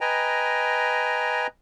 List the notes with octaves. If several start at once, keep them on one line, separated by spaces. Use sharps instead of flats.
B4 D#5 G5 G#5 A#5